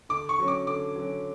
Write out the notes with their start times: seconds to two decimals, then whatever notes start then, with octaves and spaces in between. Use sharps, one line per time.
0.09 D3 D6
0.29 C#6
0.39 F#3 C#4
0.48 D6
0.67 D3 D6
0.95 F#3 C#4